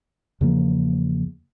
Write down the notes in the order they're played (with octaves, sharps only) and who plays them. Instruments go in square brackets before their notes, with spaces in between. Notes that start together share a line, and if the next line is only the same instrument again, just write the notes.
[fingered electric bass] E2 C#3 F3 A#3